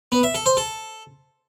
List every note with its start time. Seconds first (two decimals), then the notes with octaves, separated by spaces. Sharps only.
0.12 B3
0.23 E5
0.35 A4
0.46 C5
0.57 A4